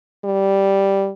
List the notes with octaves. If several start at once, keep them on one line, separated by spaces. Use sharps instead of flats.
G3